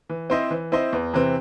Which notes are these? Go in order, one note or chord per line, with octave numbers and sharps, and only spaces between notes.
E3
C4 E4 C5 D#5
E3
C4 E4 C5 D#5
E2
C3 E3 C4